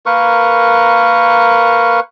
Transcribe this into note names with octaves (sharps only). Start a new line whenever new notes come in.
A#3 A#4 B4 C#6